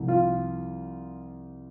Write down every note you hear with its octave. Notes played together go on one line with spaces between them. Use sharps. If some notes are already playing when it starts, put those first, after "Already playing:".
Already playing: C2 C3 F3 G#3
F4